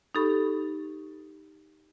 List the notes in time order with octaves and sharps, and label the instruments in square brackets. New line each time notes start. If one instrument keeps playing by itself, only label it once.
[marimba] D#4 G4 A4 B5 C#6